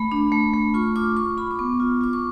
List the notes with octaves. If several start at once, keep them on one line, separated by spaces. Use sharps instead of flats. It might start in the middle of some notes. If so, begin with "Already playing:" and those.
Already playing: A3 B5
D4
A3
A3
F4 C#6
F4 D6
F4 C#6
F4 B5
D6
B3 C#6
F4
F4 D6
C#6